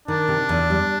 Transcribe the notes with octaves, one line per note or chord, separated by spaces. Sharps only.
D#3 D4
C3
E2
G3